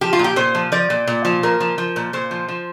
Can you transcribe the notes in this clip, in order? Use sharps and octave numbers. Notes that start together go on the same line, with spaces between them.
F3 G4
F4
A#2
G4
A#2 C5
F3
F3 D5
A#2
A#2
F3
A#2 A#4
F3
F3
A#2
A#2 C5
F3
F3